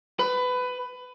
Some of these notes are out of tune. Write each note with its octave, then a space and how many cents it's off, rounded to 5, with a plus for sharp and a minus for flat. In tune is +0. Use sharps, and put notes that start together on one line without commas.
B4 +20